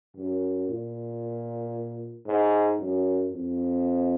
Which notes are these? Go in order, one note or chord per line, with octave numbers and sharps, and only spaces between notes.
F#2
A#2
G#2
F#2
F2